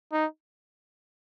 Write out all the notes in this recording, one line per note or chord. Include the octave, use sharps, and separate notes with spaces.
D#4